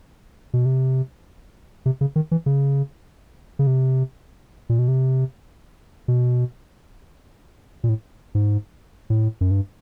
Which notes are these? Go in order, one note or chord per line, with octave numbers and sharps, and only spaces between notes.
B2
C3
C3
C#3
D#3
E3
C#3
C#3
C3
A#2
B2
C3
B2
A#2
A2
G#2
A2
F#2
G2